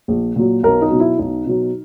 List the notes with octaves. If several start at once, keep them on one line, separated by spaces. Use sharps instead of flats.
A#1
A#2 F#3
B1 A#4
D#4
B2 F#3
E4
B1 D#4
B2 F#3